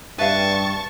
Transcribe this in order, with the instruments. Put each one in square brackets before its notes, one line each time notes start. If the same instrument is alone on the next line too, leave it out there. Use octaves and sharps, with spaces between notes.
[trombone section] G2 [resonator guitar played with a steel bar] B4 E5 F5 [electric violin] A5 C#6